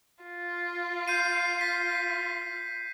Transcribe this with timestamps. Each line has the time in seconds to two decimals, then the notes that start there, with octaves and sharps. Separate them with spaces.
0.24 F4
1.08 G6 C7 D#7
1.61 B6